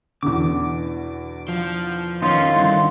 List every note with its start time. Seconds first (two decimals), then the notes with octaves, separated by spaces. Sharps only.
0.23 E2 B2 D3 D6
1.48 F3
2.22 D#3 F#3 B3 C#4 F4 C6
2.56 G2 D3 E4